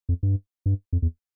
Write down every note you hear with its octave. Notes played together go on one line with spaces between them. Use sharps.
F2
G2
G2
F2
E2